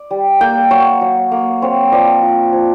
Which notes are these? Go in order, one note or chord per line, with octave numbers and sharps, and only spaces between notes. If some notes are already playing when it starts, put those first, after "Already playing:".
Already playing: D5
G3
A#3 G5
F#3 C#5
F#3
A#3
C4 C#5
F3 D5
F4
F3